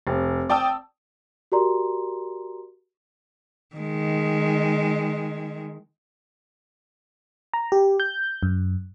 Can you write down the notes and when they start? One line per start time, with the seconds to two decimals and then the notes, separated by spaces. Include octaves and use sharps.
0.07 F1
0.50 D5 G5 A5 D#6 E6
1.52 F#4 G4 A#4 D5 A#5 C6
3.76 D#3 G#3
7.54 A#5
7.72 G4
8.00 G6
8.43 F#2